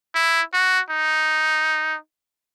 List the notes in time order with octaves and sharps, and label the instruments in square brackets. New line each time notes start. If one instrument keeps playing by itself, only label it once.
[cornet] E4
F#4
D#4